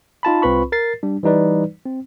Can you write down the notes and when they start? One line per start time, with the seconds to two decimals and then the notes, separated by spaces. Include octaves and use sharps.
0.23 D#4 F4 A5 B5
0.42 C2 C4 F4 B4 B5 C#6
0.72 A#4 A6 C7
1.03 G3 D4
1.23 E3 G3 D#4 B4 D5
1.86 C4